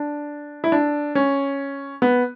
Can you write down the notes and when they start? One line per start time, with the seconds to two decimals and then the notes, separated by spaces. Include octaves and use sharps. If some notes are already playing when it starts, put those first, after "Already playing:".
Already playing: D4
0.64 E4
0.72 D4
1.15 C#4
2.02 B3